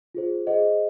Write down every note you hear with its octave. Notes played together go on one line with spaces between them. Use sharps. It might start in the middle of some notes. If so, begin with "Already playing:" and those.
F4 G#4 C5
G#4 C5 D#5 F#5